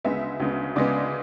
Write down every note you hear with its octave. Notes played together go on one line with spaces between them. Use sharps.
D2 C#3 G#3 B3 E5
D2 C#3 G#3 B3
D2 C#3 G#3 B3 D5